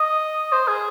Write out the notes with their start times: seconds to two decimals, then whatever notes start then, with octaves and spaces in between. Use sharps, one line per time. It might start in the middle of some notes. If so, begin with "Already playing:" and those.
Already playing: D#5
0.52 C5
0.68 G#4